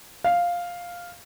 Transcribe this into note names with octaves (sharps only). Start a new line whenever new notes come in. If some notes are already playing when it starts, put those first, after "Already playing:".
F5